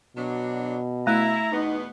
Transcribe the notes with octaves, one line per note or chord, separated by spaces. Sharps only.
B2 F#3 D4
A3 E4 A#5
E2 B2 B3 D#4